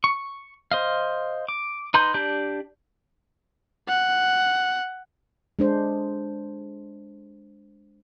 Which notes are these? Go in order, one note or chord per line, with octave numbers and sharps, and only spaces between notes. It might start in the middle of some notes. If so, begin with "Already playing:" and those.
C#6
C5 D#5 F5
D6
D#4 B4 A#5 C6 G6
D4 G4 D5 A5 G6
F#5
G#3 D4 C5